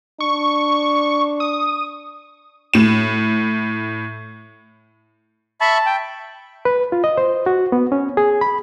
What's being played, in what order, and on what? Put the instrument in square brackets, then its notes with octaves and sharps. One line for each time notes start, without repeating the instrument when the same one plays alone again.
[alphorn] D4 [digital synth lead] C#6
[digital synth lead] D#6
[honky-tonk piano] A2 E7
[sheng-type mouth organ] E5 B5 C#6 [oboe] A5
[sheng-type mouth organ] G5
[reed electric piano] B4
F4
D#5
C5
F#4
B3
C#4
G#4
B5